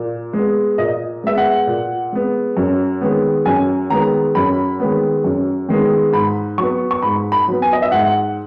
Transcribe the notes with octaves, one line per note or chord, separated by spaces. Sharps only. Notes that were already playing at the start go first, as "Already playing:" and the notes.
Already playing: A#2
G#3
B3
A#2 D#5
G#3 B3 E5
F#5
A#2
G#3 B3
F#2
D#3 G#3 B3
F#2 G#5
D#3 G#3 B3 A#5
F#2 B5
D#3 G#3 B3
F#2
D#3 G#3 B3
G#2 B5
F#3 B3 C#6
C#6
G#2 B5
B5
F#3 B3
G#5
D#5
E5
G#2 F#5